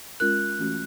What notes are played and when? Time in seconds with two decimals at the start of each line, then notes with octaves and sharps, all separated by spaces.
0.20 G#3 C#4 F4 A#4 F#6
0.59 E3 A3 C#4 F#4